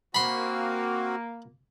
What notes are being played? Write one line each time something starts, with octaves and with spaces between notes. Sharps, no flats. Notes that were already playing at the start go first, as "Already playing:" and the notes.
A#3 C4 F#4 B5 C6